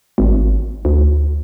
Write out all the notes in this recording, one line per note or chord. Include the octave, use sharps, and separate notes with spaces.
G#1
D2